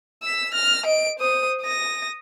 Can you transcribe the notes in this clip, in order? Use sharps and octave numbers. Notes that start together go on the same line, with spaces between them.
E6 B6
F6 A#6
D#5 D7
C5 D#6
D#6 A#6